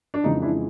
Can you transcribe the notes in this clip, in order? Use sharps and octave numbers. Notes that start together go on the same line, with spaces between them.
D4
F2 C#3 E3 G#3 D#4
D4 E4